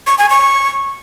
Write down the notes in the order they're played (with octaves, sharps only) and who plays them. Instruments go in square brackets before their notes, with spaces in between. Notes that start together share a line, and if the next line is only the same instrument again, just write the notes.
[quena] C#6
G#5
C#6